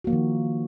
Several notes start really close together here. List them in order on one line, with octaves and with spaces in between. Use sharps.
F#4 A#3 F3 D#3